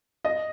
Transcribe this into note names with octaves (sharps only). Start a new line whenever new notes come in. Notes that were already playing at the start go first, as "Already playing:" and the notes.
D#5